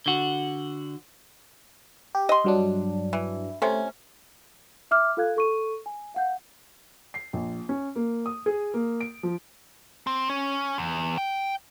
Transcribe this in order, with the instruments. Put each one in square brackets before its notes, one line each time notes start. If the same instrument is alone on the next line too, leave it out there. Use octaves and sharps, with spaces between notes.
[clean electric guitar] D3 F#4
[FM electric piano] G4
[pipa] D#5 C6
[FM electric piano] G2 F#3 D4
[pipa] E3
[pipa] C3 C#4 [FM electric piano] A3
[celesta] E5 D6 F6
F4 A4 F5 F#6 G#6
A4 C#6 D#7
G#5
F5 F#5 G6
[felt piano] C7
A#1
C#4
A#3
D#6
G#4
A#3
D7
F3
[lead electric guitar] C4
C#4
E2
G5